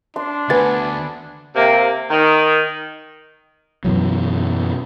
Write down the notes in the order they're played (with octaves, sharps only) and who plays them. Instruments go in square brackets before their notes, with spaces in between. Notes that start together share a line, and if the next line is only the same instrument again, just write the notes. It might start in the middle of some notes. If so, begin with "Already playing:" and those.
[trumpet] D4 [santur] C6
[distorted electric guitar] D2 [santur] B3 G#5 [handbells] B4 A6
[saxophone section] C3 A#3
D#3
[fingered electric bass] F#2 B2 E3 F#3